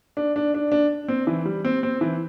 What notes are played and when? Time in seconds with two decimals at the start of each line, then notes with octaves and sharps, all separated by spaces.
0.17 D4
0.36 D4
0.54 D4
0.72 D4
1.08 C4
1.27 E3
1.45 G3
1.65 C4
1.83 C4
2.01 E3